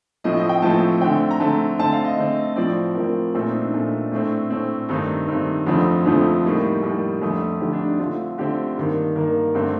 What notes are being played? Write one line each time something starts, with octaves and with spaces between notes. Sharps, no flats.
A2 F3 A3 C4 D#5
D#5
G5
A2 F3 A3 C4 A5
D3 A3 C4 G5
A#5
D3 A3 C4 A5
D3 A3 C4 A5
F5
D#5
D3 A3 C4
A2 F3 C4 D5
A2 F3 C4 A#4
A#2 A3 C4 A4
D#4
D4
A#2 A3 C4
A2 A3 C4 D4
A2 A3 C4
G2 D#3 A3 C4 D#4
G2 D#3 A3 C4
F2 D3 F3 A3 C4
F2 D3 F3 A3 C4
A2 G3 A#3 D#4
A2 G3 A#3 A4
F2 D3 A3
F2 D3 A3 G4
D4
D#4
D3 A3 C4 F4
D3 A3 C4 G4
G2 D#3 A#3
G2 D#3 A#3 A#4
G2 D3 A3 C4